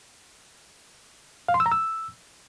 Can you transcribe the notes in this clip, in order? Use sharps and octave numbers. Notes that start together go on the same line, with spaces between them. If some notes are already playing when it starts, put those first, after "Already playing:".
F5
C6
E6
A#5
E6